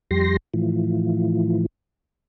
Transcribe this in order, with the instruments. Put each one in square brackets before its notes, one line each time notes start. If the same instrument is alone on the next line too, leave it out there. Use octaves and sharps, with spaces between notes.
[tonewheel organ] F2 G3 G4 C6 A#6
A2 E3 F3